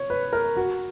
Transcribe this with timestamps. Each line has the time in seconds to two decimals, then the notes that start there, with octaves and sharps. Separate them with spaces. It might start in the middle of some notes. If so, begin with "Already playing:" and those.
Already playing: C#5
0.10 B4
0.33 A#4
0.57 F#4